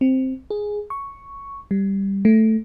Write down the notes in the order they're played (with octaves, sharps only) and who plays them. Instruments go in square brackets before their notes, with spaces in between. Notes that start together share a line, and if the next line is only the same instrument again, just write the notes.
[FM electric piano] C4
G#4
C#6
G3
A3